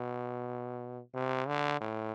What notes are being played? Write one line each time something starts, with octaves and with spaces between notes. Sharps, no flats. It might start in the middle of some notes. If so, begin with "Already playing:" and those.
Already playing: B2
C3
D3
A2